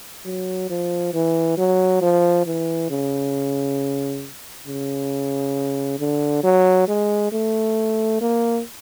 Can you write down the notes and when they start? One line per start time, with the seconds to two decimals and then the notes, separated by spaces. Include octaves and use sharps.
0.25 F#3
0.70 F3
1.14 E3
1.58 F#3
2.02 F3
2.46 E3
2.90 C#3
4.67 C#3
6.00 D3
6.44 F#3
6.88 G#3
7.32 A3
8.21 A#3